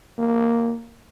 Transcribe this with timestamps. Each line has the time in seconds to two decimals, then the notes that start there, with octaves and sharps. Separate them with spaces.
0.19 A#3